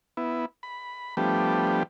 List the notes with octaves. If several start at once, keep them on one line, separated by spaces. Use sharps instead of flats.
B3 E4
B5
F3 G3 A3 B3 D4 G4